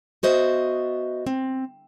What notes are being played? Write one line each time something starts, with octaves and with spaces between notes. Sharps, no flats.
B3 F#4 C5 D#5 E5
C4